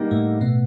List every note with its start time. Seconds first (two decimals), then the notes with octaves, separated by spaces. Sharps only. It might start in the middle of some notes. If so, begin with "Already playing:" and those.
Already playing: D3 G3 A#3 D#4
0.11 A2 A3
0.41 B2 B3